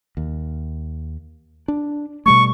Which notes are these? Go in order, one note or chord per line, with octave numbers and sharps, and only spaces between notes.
D#2
D4
B2 G3 A3 C#6